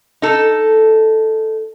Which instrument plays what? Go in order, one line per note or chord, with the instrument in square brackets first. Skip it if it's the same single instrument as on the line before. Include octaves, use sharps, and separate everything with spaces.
[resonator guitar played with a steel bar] D#4 A4